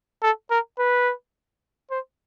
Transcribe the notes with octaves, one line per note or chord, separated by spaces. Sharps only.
A4
A#4
B4
C5